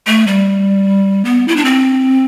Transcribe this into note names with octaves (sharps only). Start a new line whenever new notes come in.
A3
G3
B3
E4
D4
C4